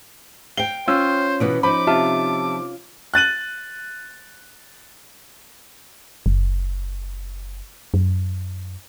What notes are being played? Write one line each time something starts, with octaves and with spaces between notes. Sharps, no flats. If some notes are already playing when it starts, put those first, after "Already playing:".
F5 G5 G7
C#4 F4 C5 E6
B2 E3 B3
F3 D#4 B5 D6
C3 F4 E5 A5
F#6 A6 D#7 F#7
F#1
F#2